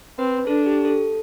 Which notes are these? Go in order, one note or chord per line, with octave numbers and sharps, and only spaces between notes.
C4 B4
D4 A4
G4
A4